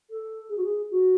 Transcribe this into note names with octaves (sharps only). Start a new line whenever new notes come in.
A4
G#4
F#4
G#4
F#4